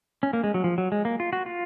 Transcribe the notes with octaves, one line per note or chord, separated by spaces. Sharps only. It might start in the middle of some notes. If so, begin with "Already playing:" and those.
C#4
A#3
G#3
F#3
F3
F#3
G#3
A#3
F4
F#4
F4